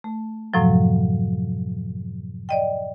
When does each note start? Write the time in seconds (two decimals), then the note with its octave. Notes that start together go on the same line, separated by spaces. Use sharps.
0.04 A3
0.54 F#2 A2 C3 F3 F#3
2.49 D5 D#5 G5